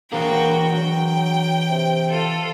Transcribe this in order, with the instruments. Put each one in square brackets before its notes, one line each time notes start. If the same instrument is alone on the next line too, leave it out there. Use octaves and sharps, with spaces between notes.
[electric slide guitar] E3 D4 G#4 [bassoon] A#3 [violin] F#4 G5
[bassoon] F#3 [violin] G5
[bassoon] C3
[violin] F4 A4